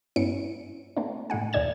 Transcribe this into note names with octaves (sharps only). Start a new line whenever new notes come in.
G2 B3 C#4 E4 C#7 D7
A3 A#3 C4 D4
A2 A3 D#4 F#5 G#5
D#2 A#2 D#4 D5 G#6 E7